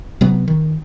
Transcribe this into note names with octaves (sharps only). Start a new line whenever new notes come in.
C3 F#3 B3
D#3